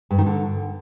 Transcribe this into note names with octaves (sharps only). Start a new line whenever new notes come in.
G2
D#3
D3